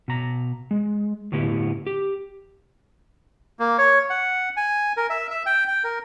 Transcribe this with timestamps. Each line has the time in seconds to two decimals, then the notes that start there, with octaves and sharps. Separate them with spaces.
0.08 B2 A#5
0.71 G#3
1.32 A2 D3 B3 E4 G4
1.87 G4
3.59 A#3
3.78 C#5
4.10 F#5
4.57 G#5
4.97 A#4
5.10 E5
5.30 E5
5.46 G5
5.68 G5
5.84 A#4